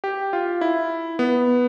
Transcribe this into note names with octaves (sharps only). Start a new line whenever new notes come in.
G4
F4
E4
B3